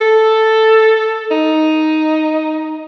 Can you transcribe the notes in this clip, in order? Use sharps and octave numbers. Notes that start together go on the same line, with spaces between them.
A4
D#4